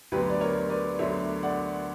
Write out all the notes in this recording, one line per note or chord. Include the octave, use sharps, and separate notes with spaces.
D2 D3 F#3 B3 G4 B4
D5
A#4 C#5
B4 D5
D2 D3 F#3 B3 C#5 E5
D5 F#5